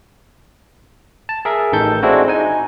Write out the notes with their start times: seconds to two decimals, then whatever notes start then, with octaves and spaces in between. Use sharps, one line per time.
1.29 A5
1.45 G#4 A#4 E5
1.72 A1 D#3 A4 G6
2.03 G#3 C4 D4 E4 F#4
2.28 D#4 G#5